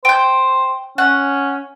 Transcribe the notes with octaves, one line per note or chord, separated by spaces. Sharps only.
C5 G5 G6
C#4 F#5